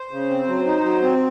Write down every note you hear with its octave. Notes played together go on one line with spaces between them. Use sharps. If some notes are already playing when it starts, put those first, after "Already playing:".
Already playing: C5
C#3
C4
F#3
D#4
F#3
C4